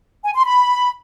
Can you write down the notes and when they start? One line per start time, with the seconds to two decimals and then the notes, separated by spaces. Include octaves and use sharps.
0.24 G#5
0.34 C6
0.45 B5